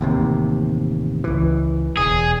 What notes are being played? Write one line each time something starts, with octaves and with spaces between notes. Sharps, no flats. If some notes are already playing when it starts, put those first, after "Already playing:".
A1 D#2 C3
C#2 E3
E1 G#4